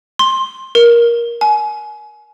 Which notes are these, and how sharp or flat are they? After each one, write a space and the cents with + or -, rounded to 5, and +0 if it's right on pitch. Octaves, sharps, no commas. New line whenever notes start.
C6 +15
A#4 +15
G#5 +30